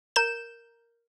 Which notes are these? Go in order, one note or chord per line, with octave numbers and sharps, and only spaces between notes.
A#4 G6 E7